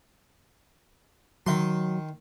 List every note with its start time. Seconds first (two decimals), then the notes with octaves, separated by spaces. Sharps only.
1.46 D#3 F#3 C6